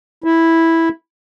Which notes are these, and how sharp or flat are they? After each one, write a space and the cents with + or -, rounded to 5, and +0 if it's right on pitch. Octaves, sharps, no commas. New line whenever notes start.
E4 -5